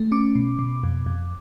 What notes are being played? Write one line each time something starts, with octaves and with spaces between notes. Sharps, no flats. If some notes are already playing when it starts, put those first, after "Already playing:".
Already playing: A3
C#4 D6
B2
B2
F2
F2